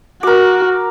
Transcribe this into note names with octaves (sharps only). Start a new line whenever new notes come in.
F#4 A#4 D6